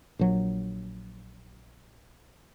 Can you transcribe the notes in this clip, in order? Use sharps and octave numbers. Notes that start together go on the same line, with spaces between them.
A#1 F#3